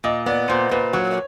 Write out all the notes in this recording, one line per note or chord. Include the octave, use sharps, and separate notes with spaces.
A#2 D#5
B3 D5
A#2 C5
A#2 B4
F#3 C#5